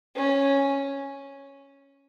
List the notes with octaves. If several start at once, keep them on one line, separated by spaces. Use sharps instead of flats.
C#4